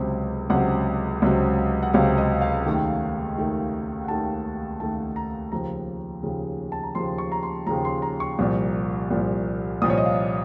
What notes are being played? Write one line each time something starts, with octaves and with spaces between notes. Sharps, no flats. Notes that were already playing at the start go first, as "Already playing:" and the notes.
Already playing: C#2 C3 F#3 C4
C#2 C3 F#3 C4 F#5
C#2 C3 F#3 C4
F#5
C#2 C3 F#3 C4 F5
D#5
F5
D#2 D#3 A3
D#2 D#3 A3
F#5
D#2 D#3 A3 A5
D#2 D#3 A3 A5
A#5
D#2 C#3 F3 A#5
D#2 C#3 F3
A5
A#5
D#2 C#3 F3 C6
C#6
A#5
C6
D#2 C#3 F3 A#5
C6
A#5
C#6
C2 A#2 F3
C2 A#2 F3
C2 A#2 F3 D#6
C#5
D#5
F5